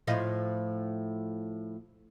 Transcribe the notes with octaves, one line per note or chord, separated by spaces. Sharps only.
A2 F3 D#5